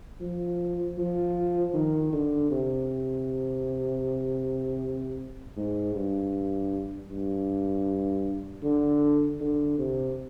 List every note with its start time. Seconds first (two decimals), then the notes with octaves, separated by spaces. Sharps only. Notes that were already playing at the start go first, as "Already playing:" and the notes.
0.21 F3
0.98 F3
1.74 D#3
2.13 D3
2.51 C3
5.57 G#2
5.95 G2
7.11 G2
8.63 D3
9.40 D3
9.79 C3